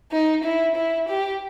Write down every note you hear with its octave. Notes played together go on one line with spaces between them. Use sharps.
D#4
E4
E4
G4